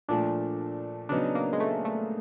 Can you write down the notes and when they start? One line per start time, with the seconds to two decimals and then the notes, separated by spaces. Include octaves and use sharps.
0.09 A#2 F3 A3 D4
1.09 C#3 F#3 B3 D4 D#4
1.35 A#3
1.53 G#3
1.60 A3
1.85 A3